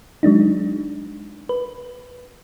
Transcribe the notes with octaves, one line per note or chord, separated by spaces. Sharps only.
F#3 G#3 D4 D#4
B4